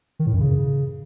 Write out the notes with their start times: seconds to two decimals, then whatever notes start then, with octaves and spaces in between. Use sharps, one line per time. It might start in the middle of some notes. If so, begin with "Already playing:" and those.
0.19 D#3
0.26 A2
0.33 F#2
0.40 C#3